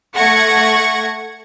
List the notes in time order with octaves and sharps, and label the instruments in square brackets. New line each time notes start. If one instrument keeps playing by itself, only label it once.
[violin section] A3 F#5 C#6 G#6 A#6